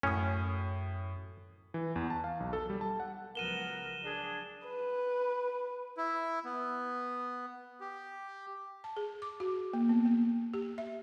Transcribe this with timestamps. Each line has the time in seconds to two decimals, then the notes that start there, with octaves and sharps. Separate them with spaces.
0.03 F#2 A2 C#4 D#6
1.74 E3
1.96 E2
2.10 A5
2.24 F5
2.40 B1
2.53 A4
2.70 G3
2.81 A5
3.00 F#5
3.35 C#2 F3 F#3 B3 A#4 D#7 E7 G7
4.04 D4 G#4
4.68 B4
5.97 E4
6.45 B3
7.80 G4
8.84 A5
8.97 G#4
9.22 D6
9.40 F#4
9.73 A#3
9.89 B3
10.06 A#3
10.54 G4
10.78 E5